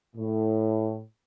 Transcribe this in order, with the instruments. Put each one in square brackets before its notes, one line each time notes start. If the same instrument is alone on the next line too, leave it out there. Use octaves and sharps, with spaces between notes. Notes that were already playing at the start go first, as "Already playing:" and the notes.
[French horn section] A2